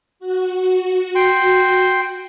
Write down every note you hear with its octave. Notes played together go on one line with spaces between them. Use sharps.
F#4
G5 C6